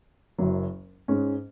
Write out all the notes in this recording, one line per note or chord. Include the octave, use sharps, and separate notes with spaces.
F#1 F#2 F#3
G#2 G#3 C#4